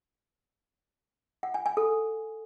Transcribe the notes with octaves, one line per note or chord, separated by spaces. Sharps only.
F#5
G#5
G#5
A4